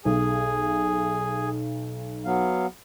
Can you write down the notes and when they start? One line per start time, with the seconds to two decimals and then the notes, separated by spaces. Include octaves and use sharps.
0.05 B1 G#4 G#5
2.25 F#3 B3 F5